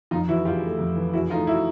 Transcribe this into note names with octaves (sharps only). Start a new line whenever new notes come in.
F2 D#4 F4
E3 E4 F#4
C#3 F4 G4
A3
F2
E3
C#3 E4 F#4
A3 D#4 F4
E4 F#4